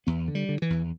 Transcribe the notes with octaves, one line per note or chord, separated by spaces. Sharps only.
E2 B3
D3
G3
D3
E3
E2